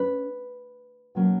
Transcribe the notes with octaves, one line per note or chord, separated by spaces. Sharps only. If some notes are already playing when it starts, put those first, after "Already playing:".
Already playing: C#4 B4
B2 F#3 A#3 C#4